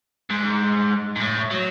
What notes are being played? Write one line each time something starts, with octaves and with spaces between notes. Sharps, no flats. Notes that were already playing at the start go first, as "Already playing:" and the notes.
G#2
G#2
A2
F#3